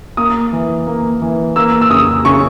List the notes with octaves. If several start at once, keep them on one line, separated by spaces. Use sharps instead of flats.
A#3 D#6
E3
A#3
E3
A#3 E6
E6
C#3 D#6
C#3 C#6